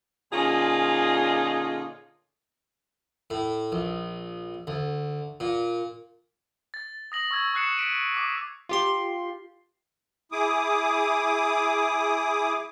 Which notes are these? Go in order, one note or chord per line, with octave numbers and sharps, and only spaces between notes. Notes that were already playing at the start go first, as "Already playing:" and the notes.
A#2 D3 C#4 D#4 F4 G#4
A2
A#1
D2
A#2
A6
D#6 A#6 F#7
C#6 E6 G#6
C#6 D#6 F#6 C7 C#7 E7
B6 D7 D#7
D6 D#6 B6
F4 G4 C6
E4 G#4 D6 D#6